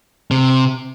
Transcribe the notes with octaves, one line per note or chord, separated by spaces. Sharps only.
C3